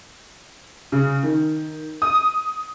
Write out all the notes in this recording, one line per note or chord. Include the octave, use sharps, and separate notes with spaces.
C#3
D#3
D#6